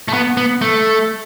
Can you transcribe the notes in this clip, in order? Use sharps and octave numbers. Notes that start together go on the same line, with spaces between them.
A3
B3
B3
A3